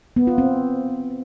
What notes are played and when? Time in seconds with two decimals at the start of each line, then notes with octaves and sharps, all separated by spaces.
0.16 B3
0.27 F4
0.38 C4